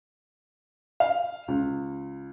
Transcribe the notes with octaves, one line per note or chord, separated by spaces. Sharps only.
F5
C#2